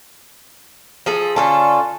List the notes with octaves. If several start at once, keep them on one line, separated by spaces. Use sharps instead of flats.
F3 G#4 A4
D3 C#4 F4 A4 A5